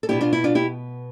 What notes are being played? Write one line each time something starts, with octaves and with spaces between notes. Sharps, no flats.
A4
B2 B3 D4 E4 G4
D4 F4
E4
D4 F4
E4 G4